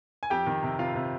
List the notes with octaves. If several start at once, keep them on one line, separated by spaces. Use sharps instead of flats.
G#5
F2 G4 G5
D#3
C3
C3 F4 F5
C3